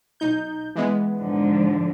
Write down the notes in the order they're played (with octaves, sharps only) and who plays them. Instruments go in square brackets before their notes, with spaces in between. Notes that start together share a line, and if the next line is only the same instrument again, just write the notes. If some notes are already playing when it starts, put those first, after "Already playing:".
[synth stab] B1 D#4 G6
E3 G#3 B3
[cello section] G#2 D3 F3